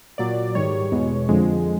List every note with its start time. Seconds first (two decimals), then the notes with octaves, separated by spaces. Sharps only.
0.18 A#2 F#3 D5
0.55 G#2 D#3 G3 C#5
0.91 E2 B2 G#3
1.29 F2 D3 F3 G#3